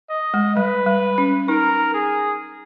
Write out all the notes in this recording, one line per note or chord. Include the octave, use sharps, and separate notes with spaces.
D#5
G#3
G3 B4
G3
C#4
D#4 A#4
G#4